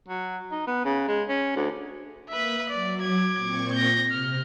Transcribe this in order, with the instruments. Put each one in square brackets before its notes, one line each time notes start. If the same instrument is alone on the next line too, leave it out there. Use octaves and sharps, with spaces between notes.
[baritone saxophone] F#3
D#4
B3
C#3
G#3
C#4
D2
[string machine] A#3 D#6 [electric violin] B4 E5
[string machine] F#3 [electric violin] D5
[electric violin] D6 G#6
[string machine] A#2 C4 C#6
[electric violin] G6 A#6
[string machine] C3 [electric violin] F6